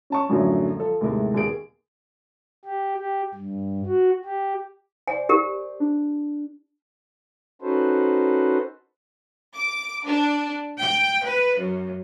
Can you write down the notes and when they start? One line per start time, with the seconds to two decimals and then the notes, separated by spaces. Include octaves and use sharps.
0.10 C#4 A5 C#6
0.29 F#2 A2 D3 F3 F#3
0.77 F3 A4
1.01 D#2 A2 C3 G#3
1.34 D#2 B2 G#4 D7
2.65 G4
2.97 G4
3.35 G2
3.86 F#4
4.25 G4
5.08 C5 D5 G#5
5.29 G4 A#4
5.80 D4
7.62 C#4 D#4 F#4 A4 B4 C5
9.54 D6
10.06 D4
10.79 G5
11.26 B4
11.58 F#2